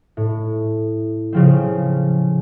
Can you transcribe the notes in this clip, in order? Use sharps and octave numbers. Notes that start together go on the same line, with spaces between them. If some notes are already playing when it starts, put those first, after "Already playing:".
A2
C#3 F3 C4